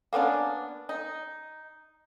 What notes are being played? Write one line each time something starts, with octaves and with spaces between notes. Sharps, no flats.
A#3 B3 C#4 D4
D#4